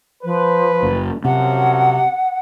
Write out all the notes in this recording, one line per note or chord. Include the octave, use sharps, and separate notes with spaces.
F3 B4
F#1
F#2 C3 F3 F#3 F#5